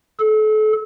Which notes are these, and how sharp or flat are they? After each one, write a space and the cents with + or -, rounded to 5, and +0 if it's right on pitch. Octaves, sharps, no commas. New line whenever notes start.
A4 -35